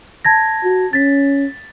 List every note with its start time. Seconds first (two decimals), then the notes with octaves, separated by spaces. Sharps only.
0.25 A5 G#6 A#6
0.63 F#4
0.93 C#4 A6 B6